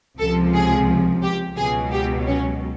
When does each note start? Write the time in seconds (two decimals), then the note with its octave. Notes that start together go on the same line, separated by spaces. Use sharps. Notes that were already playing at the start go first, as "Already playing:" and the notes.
0.19 C#2 C3 F3 A4
0.54 G#4
1.22 G4
1.57 C#2 B2 F#3 G#4
1.91 G4
2.26 C#4